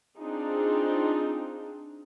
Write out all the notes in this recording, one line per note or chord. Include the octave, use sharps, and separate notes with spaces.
C4 D4 D#4 F4 G#4